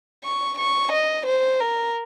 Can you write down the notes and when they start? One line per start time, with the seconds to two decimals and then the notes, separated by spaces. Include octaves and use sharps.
0.24 C#6
0.58 C#6
0.92 D#5
1.26 C5
1.60 A#4